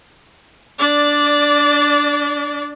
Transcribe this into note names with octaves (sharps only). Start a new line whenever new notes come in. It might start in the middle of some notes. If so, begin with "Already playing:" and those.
D4 D5